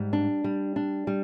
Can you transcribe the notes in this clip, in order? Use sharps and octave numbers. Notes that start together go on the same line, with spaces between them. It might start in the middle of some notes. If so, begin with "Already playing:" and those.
Already playing: G#2 G3
D4
G3
D4
G3